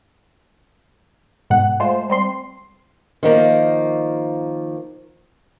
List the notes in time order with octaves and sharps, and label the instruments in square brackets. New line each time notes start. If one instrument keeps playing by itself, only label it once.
[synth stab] G#2 B2 F#5
G#3 A3 F4 C5
G3 C4 C6
[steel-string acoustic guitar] D#3 F3 A#3